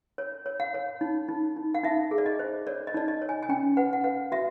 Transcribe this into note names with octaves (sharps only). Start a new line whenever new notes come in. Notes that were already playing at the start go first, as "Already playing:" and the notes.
C#5
C#5
F5
C#5
D#4
D#4
D#4
F5
D#4 E5
G#4
D5
D#5
C5
C#5 D5
D#5
D#4 D5
D#5
C#5
G#5
G#5
C#4 G5
B4 F#5
F#5
B4 F5
F#4 E5